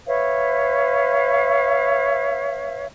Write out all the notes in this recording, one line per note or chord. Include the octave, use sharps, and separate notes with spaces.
B4 C#5 E5 F5